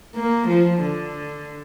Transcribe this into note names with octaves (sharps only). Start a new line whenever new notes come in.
A#3
F3
D3